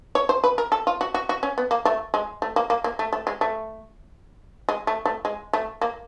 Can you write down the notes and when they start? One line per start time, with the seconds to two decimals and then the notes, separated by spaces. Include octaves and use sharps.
0.15 C#5
0.29 C5
0.44 B4
0.58 A#4
0.72 A4
0.87 F4
1.01 F#4
1.14 F#4
1.29 F#4
1.43 C#4
1.58 B3
1.71 A#3
1.85 A3
2.14 G#3
2.42 A3
2.56 A#3
2.70 A#3
2.84 A#3
2.99 A3
3.13 A3
3.27 G#3
3.41 A3
4.69 G#3
4.87 A3
5.05 A3
5.25 G#3
5.53 A3
5.82 A#3